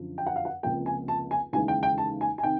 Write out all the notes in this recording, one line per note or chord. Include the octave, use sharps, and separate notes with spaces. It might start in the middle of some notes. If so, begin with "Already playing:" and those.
Already playing: F#2 D3 F3
G5
F#5
F5
F#5
C#2 C3 F3 A#3 G5
G#5
A5
G#5
D#2 C#3 E3 G#3 G#5
G5
G5
A5
G#5
G#5
C3 D#3 G5